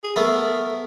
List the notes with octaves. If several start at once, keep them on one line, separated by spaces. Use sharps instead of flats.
G#4
A3 B3 A#4